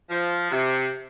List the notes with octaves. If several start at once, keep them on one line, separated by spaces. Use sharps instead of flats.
F3
C3